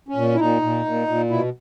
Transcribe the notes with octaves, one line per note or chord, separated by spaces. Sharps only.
C#4
A#2
E4
A#2 D#4
A#2
A#2
A#2
B2 E4